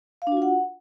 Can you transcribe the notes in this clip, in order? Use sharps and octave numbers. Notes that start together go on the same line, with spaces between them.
F5
D4
F#4
F4
F#5